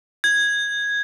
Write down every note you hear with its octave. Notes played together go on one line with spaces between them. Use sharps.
G#6